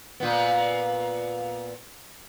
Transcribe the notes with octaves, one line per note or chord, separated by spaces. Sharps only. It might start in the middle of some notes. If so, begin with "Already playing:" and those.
A#2 B3